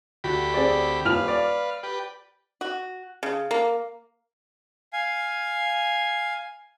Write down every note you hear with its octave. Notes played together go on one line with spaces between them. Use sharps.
D2 F#4 G4 B5
C4 G#4 D5
D#1 B4 F5 F6 F7
D5
G4 B4
F#4
C#3
A#3
F5 G#5